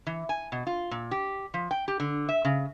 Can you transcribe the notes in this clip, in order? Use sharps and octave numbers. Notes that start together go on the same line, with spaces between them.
E3
G#5
B2
F4
A#2
G4
F3
G5
G4
D3
E5
C#3